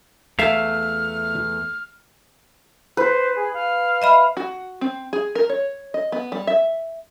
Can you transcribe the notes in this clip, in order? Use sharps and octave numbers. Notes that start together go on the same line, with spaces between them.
E2 A3 E5 F5 F6
B4 C5
G#4
F5
D#5 E5 B5
F#4
C4
G#4
A#4
C#5
D#5
B3
G3
E5